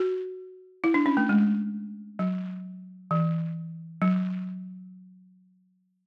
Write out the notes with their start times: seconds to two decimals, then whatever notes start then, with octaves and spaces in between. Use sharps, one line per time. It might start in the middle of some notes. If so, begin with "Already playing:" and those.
Already playing: F#4
0.84 E4
0.94 D4
1.06 C#4
1.17 A3
1.29 G#3
2.19 F#3
3.11 E3
4.02 F#3